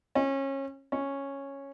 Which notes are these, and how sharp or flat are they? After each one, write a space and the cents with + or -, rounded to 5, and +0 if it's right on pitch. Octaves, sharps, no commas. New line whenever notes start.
C#4 -25
C#4 -5